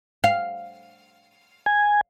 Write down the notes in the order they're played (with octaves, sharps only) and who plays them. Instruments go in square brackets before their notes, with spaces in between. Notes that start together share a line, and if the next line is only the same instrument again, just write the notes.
[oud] F5
[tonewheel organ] G#5